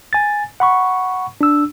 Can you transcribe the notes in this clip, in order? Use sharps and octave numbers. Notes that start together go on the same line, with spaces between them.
G#5 A6
F#5 B5 C#6
D4 E6